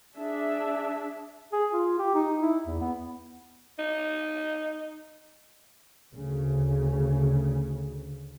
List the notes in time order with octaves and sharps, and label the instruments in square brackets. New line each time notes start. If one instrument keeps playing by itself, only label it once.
[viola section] D4 G#4 E5
[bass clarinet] G#4
F4
G4
D#4
E4
E2
B3
[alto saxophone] D#4
[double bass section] D2 C#3